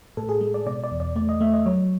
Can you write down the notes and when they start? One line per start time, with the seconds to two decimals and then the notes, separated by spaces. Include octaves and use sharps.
0.17 A2 A4
0.29 G#4
0.41 G#3
0.54 D5
0.66 B2 D5
0.84 D5
0.91 E2
1.00 D5
1.16 A3 D5
1.29 D#5
1.41 A3 E5
1.54 D#5
1.66 F#3 C#5